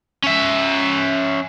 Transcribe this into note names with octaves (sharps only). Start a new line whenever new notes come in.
C#4 E5